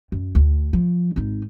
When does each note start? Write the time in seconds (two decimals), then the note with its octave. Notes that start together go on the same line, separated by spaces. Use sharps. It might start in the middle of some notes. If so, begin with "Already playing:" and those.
0.12 F#2
0.35 D2
0.73 F3
1.16 G#1 D#4